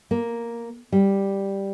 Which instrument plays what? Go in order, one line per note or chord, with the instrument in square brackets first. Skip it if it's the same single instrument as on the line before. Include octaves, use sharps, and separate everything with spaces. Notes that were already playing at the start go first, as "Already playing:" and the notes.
[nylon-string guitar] A#3
G3